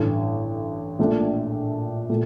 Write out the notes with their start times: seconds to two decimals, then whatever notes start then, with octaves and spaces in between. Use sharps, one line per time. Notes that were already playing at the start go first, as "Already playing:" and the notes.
Already playing: A1 G2 D3
0.99 A#1 A#2 A3 D4
2.10 A#2 A3